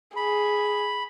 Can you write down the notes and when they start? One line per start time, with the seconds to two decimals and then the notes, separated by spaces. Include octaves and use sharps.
0.16 G#4 B5